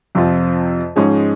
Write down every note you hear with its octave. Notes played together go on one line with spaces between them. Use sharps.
F2 C3 F3 C4 F4
G#2 F3 G#3 C#4 G#4